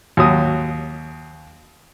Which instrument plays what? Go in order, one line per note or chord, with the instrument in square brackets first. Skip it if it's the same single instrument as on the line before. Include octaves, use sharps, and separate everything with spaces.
[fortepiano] D#2 F#3 D#6